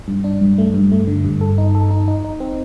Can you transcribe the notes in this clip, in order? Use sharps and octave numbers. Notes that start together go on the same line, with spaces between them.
G2
D4
G2
A3
G2
A3
D3
G2
A4
D#4
A4
D#4
D#4
D#4
C4